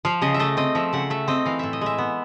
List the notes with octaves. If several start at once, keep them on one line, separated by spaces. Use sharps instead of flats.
F3 F5
C#3 D#5
E5
A3 D#5
C4 D#5
F3 E5
C#3 F#5
A3 E5
C4 D#5
E3 F5
A2 E5
D#5
G#3 E5
B3